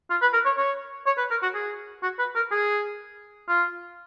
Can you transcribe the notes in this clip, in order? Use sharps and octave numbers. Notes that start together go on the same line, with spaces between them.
F4
B4
A#4
C#5
C#5
C#5
B4
A#4
F#4
G#4
F#4
B4
A#4
G#4
F4